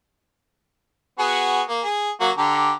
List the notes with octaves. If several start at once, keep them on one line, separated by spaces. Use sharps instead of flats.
B3 F#4 G#4
A#3
G#4
F#3 A#3 F#4
D3 G4 A#5